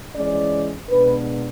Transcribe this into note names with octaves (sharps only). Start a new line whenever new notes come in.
E3 G#3 C#4 D5
B2 G#3 B3 D4 B4